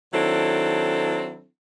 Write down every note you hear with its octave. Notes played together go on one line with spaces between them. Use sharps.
D#3 F#3 C4 D4 E4 A4